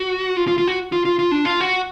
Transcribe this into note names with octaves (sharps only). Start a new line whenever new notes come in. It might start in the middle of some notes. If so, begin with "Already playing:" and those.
Already playing: F#4
F4
F4
F4
F#4
F4
F4
F4
D4
F4
F#4